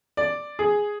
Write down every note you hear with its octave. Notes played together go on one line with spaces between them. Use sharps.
D5
G#4